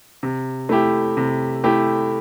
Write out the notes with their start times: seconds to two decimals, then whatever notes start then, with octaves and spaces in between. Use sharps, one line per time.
0.23 C3
0.69 A3 E4 G4
1.17 C3
1.64 A3 E4 G4